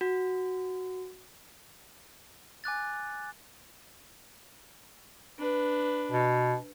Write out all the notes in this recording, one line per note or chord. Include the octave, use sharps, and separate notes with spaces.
F#4
G#5 D6 F#6 A6
D4 B4
B2